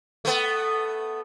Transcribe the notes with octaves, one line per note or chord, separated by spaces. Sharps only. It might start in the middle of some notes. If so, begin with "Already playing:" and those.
A3 B3